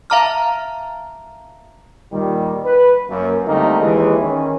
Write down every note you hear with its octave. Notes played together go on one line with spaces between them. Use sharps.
E5 F5 A5 A#5 D6 F6
A#2 D#3 G3
B4
F#2 A#3
D3 G3 A3 A#3 C4 D#4
D#2 E3 G#3
D#3 C#4